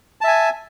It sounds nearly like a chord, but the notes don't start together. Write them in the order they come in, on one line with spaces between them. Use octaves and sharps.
A5 E5 G#5